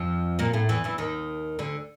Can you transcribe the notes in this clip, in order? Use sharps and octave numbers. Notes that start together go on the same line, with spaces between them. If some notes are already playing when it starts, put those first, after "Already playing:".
Already playing: F2 F3
A#2 A#3
A2 A3
E2 E3
E2 E3
D#2 D#3
D2 D3